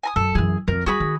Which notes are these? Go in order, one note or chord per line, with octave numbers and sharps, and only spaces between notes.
G#5 A#5 D#6
F#2 A4
F#2 E3 G#4
F2 A#4
G3 F#4 G#4 B5
D#3